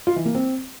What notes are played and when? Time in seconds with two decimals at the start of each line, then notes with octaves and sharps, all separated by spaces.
0.07 F4
0.16 E3
0.25 A#3
0.35 C4